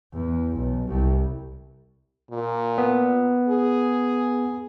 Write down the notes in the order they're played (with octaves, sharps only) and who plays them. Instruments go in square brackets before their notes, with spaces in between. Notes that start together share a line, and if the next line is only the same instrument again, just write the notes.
[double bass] E2
B1
C2
[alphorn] A#2
[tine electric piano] B3
[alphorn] G#4